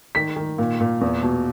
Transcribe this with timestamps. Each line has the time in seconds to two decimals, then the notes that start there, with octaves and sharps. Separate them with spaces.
0.15 D#3 B6
0.36 D#3
0.58 A#2
0.80 A#2
1.01 E2
1.23 B2